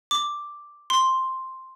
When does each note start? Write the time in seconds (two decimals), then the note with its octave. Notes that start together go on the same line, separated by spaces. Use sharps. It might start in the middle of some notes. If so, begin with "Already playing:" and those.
0.11 D6
0.90 C6